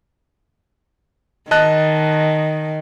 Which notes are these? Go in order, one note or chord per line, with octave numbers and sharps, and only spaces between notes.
D#3 D#5 A5 F#6